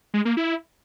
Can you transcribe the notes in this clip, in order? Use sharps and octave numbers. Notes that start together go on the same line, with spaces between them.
G#3
A#3
E4